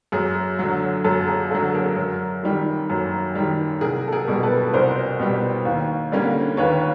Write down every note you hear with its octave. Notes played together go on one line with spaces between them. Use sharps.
F#2 G#4
D3 F#3
F#2 A4
G#4
D3 F#3 A4
G#4 A#4
F#2
D#3 G3
F#2
D#3 G3
C2 G#4 A#4
A4
G#4 A#4
B2 G3
A4 B4
C2 A#4 C5
B2 G3
D#2
D3 G3 A#3 C#4
D#2 B4 C#5